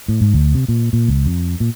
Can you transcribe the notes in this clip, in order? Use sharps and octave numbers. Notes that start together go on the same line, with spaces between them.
A2
G#2
D2
C3
A#2
A#2
C#2
F2
A#2